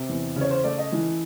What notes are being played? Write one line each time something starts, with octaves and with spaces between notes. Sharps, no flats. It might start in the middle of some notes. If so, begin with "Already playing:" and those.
Already playing: C3
E2
C#3 C#5
C5
A3 D5
D#5
E3